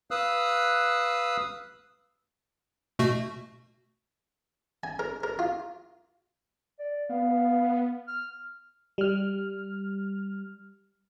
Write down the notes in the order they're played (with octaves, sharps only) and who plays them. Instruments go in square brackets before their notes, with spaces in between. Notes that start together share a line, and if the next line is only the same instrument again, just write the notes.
[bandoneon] B4 F5 D#6 E6 F#6
[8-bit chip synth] B2 A3 F#4
[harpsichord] G#5
A#4
A#4
F4
[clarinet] D5
[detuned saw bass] B3 [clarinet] F5
[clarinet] F6
[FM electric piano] G3 F6